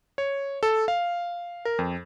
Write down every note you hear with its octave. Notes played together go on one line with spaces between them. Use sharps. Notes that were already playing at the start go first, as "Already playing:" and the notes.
C#5
A4
F5
A#4
F2